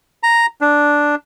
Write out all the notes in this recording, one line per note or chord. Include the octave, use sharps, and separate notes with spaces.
A#5
D4